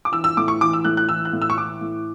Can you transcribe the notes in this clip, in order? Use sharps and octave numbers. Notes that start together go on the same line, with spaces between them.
D6
E3 E6
E6
A2 D6
C#6
E3 D6
E6
A2 F#6
F#6
E3 E6
F#6
A2
E6
C#6
E3 D6
A2